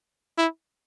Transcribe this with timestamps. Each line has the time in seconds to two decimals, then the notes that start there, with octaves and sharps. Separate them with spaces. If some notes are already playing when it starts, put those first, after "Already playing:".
0.38 E4